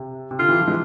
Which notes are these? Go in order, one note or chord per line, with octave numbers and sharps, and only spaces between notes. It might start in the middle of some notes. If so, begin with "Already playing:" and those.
Already playing: C3
C3
D3 F4
C3 E3
F3
E3 G#3